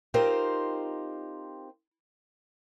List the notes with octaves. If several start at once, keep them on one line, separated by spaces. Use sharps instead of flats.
C4 D#4 F4 G4 A#4 C5